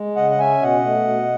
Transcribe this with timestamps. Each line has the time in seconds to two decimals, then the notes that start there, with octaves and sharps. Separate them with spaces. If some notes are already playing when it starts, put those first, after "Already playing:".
Already playing: G#3
0.16 C#3 D#5 F#5
0.31 F#5
0.39 C#4 E5 G#5
0.61 B2 D#5 F#5
0.84 A3
1.08 B2